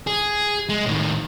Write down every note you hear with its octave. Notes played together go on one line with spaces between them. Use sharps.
G#4
G#3
A2 D#3